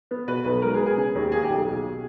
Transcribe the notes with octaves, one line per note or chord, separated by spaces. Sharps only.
B3
B2 B4
B1 B4
G#3 A#4
G#4
B3
G#4
C#3
D#2
A#3 G#4
G4
B1
G#4
B2